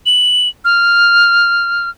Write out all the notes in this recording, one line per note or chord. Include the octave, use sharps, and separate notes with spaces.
F#7
F6